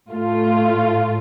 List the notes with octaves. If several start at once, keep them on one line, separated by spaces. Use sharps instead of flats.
A2 A3 F4